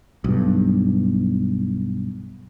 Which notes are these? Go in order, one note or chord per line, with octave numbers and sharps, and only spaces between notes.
B1 G2